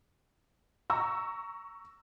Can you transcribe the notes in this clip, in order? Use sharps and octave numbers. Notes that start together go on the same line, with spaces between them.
A#5 C#6 E6